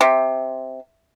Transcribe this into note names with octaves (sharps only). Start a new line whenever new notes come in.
C3